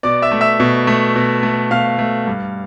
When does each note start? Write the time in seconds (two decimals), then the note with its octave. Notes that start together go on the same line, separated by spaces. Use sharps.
0.03 B2 D5 D6
0.22 E5 E6
0.32 A3
0.41 E5 E6
0.60 B2
0.87 A3
1.16 B2
1.43 A3
1.71 B2 F5 F6
1.99 A3
2.27 G2